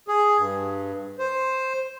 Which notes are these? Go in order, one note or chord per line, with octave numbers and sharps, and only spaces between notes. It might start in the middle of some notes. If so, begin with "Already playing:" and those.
G#4
G2
C5